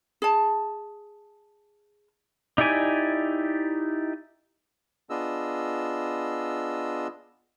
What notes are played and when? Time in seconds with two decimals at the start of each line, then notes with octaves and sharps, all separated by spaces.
0.22 G#4 A5
2.58 D#4 E4 G4 D5 G#5
5.10 B3 D4 F4 G#4 D#5 E6